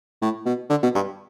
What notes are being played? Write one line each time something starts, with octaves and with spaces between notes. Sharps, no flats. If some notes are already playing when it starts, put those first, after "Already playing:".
A2
B2
D3
B2
G2